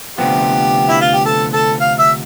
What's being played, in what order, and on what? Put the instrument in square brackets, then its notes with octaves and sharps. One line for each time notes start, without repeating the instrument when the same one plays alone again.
[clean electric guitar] D2 C3 F3 B3 [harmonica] G4
[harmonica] E4
F4
G4
A4
A4
F5
E5